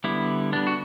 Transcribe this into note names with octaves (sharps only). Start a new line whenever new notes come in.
D3 G3 B3 E4
D3 G3 B3 D4
F#4